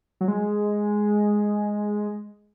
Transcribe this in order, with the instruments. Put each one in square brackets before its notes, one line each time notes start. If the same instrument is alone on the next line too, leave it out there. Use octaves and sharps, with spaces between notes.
[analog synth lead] F#3
G#3